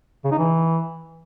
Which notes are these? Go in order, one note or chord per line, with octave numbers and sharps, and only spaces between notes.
C#3
D#4
E3